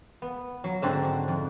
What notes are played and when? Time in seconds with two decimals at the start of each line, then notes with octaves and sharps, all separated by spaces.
0.22 B3
0.64 F#3
0.82 G#2 D3 C4 D#4 F#4 F#5
1.03 D4 F#4
1.28 F2